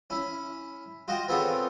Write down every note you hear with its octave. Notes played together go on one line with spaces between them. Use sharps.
C#4 E4
F4 F#4 D#5 G5
B3 C4 F4 G#4 A4 C#5